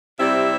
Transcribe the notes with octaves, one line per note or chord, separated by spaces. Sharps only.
C3 G3 C4 E4 E5